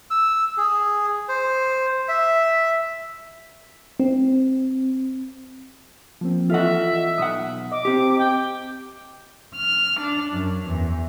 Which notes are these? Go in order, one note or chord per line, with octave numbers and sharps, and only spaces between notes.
E6
G#4
C5
E5
C4
F3 A#3 C4
E3 F4 A4 D#5 E5 F#5
B1 F#5 D#6
D#5 D6
C4 G4
G5
F6
D4
F#2
E2